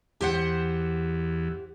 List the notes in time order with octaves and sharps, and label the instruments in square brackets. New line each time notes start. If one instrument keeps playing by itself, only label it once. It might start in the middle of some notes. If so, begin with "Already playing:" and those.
[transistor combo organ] E2 [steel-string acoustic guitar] G4 C5 F#5